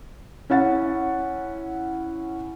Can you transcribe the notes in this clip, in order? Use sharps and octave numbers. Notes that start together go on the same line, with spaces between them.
C#4 E4 F#5 A6